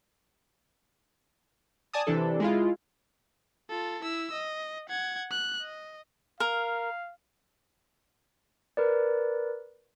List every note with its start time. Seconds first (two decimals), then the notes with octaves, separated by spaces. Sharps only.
1.93 D5 G#5 A5 D#6
2.07 C3 E3 D4 A4
2.40 G#3 E4 F4
3.69 F4 A4
4.02 E4 E6
4.32 D#5
4.89 F#5 G#6
5.31 F#6
5.61 D#5
6.40 A#4 F5
8.77 A#4 B4 D5